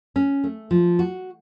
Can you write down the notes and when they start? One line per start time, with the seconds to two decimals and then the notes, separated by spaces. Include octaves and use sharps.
0.16 C#4
0.44 A3
0.71 F3
0.99 F#4